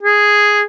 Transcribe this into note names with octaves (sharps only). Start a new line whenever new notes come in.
G#4